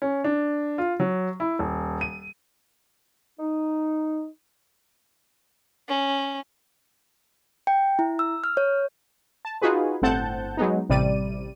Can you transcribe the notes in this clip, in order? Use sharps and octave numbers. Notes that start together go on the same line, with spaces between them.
C#4
D4
F4
F#3
E4
D#1
D#7
D#4
C#4
G5
E4
E6
F6
C#5
A5
D#4 F4 F#4 G#4 B4
G1 A2 C4 F#5 A5 G6
F#3 G#3 B3 D#4
A1 C3 G3 D5 D#7